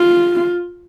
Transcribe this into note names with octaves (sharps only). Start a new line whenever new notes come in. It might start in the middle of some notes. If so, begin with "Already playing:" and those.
Already playing: F4